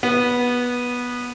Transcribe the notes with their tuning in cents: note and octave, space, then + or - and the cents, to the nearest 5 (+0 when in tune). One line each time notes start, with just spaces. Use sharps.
B3 -15